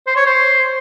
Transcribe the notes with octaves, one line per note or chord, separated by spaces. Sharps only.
C5
C#5
C5